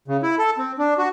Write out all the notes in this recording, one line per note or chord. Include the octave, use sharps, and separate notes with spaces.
C#3
E4
A4
C4
D4
F#4